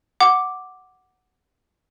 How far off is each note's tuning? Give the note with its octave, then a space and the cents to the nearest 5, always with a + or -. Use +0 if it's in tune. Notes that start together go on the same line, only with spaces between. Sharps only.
F#5 +0 D6 +0